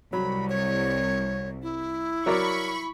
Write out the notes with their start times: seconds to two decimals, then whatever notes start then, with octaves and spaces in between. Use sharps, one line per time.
0.13 C2 F#3 B5
0.49 C#5
1.62 E4
2.26 F#3 A#4 D5 B5 C#6